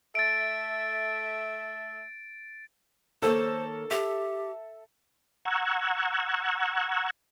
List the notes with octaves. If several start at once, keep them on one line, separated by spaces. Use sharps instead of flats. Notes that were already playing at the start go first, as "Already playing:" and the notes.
A3 A4 E5 A6 D7
D#3 A#3 A4 C5 C#5
G4 E5
F#5 A#5 C#6 E6 F#6 G#6